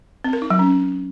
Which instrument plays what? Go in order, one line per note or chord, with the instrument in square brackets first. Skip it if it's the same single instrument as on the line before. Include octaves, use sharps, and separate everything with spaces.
[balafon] C4
A#4
D#4
F#3
C#4